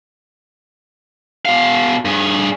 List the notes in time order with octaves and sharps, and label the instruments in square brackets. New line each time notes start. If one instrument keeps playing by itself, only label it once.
[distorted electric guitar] B2 F5
G2 G#4